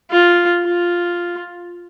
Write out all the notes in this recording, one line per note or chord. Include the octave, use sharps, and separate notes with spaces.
F4
F4